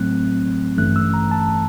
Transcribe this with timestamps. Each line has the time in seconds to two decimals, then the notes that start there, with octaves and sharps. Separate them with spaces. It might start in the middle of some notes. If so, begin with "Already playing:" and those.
Already playing: A2 F#3 A3 C4 F#6
0.78 A1 G2 E3 A3 C#4 F#6
0.96 E6
1.14 A#5
1.31 A5